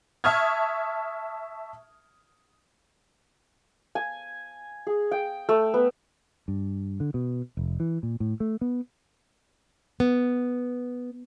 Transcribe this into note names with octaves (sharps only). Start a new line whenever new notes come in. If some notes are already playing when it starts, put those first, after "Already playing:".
E5 A5 C#6 D#6 F6 G#6
G#5
G#4
G5
A3
B3
G2
D3
B2
F1
E3
A#2
A2
A3
B3
B3